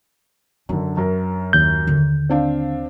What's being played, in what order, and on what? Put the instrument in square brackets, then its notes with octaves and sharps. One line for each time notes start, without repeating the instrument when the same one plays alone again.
[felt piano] F#2 D3 [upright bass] D4
[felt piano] F#2 A#4
[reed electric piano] D#2 G6
[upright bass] D3
[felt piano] C4 D4 F5